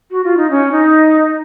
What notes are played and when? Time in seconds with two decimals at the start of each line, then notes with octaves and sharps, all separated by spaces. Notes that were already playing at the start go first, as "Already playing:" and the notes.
0.11 F#4
0.24 F4
0.37 D#4
0.50 C#4
0.72 D#4